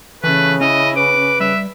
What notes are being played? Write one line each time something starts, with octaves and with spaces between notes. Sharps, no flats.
C#3 E3 A3 B4
C#4 E4 D#5
B4 D6
G3 E5